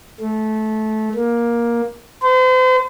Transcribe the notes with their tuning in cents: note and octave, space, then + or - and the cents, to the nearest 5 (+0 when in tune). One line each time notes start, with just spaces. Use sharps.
A3 -20
A#3 +15
C5 -40